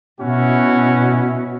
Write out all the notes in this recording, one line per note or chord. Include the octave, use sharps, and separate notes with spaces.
B2 C#4 E4 F#4